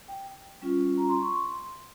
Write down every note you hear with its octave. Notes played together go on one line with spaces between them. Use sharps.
G5
G3 C#4 F4
A#5
C6
C#6
C6